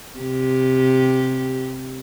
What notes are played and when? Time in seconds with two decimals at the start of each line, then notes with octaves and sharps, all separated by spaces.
0.19 C3 G4